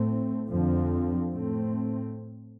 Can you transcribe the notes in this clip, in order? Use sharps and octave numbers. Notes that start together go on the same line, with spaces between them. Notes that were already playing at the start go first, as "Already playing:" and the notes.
Already playing: A2 A3 C4
F2 D3 F3 C4
A2 A3 C4